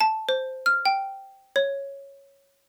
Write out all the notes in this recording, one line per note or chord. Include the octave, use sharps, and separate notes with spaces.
A5
C5
F6
G5
C#5